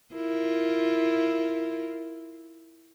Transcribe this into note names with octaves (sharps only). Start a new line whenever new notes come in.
E4 F4 A#4